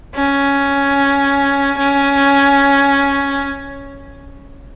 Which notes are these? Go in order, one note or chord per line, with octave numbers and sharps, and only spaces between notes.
C#4
C#4